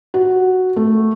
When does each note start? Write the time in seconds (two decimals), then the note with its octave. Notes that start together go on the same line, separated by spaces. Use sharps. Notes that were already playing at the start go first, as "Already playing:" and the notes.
0.14 F#4
0.76 A3